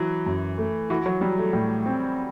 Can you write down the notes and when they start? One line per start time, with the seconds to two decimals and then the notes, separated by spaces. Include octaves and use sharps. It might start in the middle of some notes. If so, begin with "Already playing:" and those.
Already playing: E3 F#3
0.26 F#2
0.58 A3
0.90 E3 F#4
1.06 F#3
1.21 F#3 G3
1.38 A3
1.53 A2 G3
1.86 C4